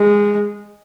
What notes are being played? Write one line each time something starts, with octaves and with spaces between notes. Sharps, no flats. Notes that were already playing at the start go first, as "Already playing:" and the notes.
Already playing: G#3